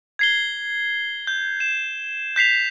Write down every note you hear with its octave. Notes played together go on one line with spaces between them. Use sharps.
G#6 C7 G7
G6
E7
G6 B6 C7 F7